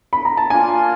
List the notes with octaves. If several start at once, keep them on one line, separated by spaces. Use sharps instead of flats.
B5
A#5
A5
A#3 D4 F4 G#5